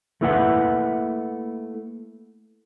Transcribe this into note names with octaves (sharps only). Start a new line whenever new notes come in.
A3 A#3 E4 B4 E5 F#5